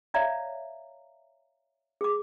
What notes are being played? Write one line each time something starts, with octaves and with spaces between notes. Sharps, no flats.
C#5 D5 E5 F5 A#5
G#4 D6